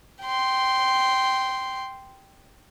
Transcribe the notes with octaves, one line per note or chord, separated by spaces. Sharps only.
G5 C6